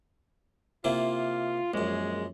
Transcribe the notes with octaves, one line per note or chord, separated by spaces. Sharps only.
C3 A#3 E4 F4
A#1 F#2 G#3